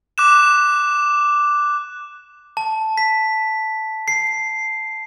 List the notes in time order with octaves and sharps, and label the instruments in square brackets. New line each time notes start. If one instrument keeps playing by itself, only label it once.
[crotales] D6 F#6 E7
[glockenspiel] A5
B6
C7